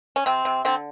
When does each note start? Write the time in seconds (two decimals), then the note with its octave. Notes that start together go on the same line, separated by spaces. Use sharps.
0.16 C#4
0.26 C3 C4
0.45 C3
0.65 D3 C4